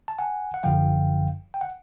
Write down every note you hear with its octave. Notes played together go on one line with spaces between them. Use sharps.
A5
F#5 G#5
F#5
G1 F#2 D3 F3 F5 G5
G5
F#5